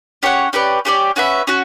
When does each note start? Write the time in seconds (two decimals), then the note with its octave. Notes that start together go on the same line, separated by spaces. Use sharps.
0.23 C#4 G4 C#5 F#5
0.53 C#4 G4 B4 D5
0.85 C#4 G4 B4 D5
1.16 C#4 F#4 B4 E5
1.47 C#4 F#4